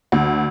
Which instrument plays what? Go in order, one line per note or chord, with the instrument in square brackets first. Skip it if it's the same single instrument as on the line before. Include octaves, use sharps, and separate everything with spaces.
[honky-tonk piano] D2